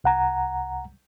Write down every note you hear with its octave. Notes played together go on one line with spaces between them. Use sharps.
C2 F#5 A#5